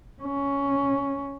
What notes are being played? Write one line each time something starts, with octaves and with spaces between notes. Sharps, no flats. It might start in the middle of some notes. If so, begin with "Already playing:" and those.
C#4